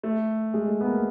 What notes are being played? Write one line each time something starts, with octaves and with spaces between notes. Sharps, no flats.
A3
G#3
A3
B3
A#3